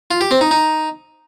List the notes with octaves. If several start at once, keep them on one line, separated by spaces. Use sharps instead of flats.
F4
G4
C4
D#4
D#4